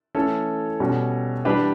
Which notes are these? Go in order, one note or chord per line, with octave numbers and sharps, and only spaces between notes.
E3 A3 C#4 A4 C#5
B2 G3 C#4
E3 G3 D4 G4 B4